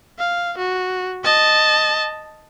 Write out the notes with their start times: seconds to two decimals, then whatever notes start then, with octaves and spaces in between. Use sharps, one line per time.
0.19 F5
0.58 F#4
1.24 D#5 A5